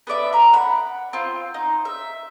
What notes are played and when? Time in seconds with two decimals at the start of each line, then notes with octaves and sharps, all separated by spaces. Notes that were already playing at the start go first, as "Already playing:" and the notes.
0.07 B3 A4 D5 E5
0.33 A#5 B5
0.53 F#5 B5
1.13 C4 F4
1.54 D#4
1.85 E5